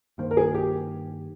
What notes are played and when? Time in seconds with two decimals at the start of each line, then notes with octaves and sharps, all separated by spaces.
0.18 G2 D#3 A#3 C5
0.31 A#4
0.37 G#4
0.54 G4